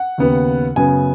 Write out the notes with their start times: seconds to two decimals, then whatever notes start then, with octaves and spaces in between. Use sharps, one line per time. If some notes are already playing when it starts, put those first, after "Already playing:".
Already playing: F#5
0.18 D#2 C#3 B3
0.76 F#2 C#3 B3 G#5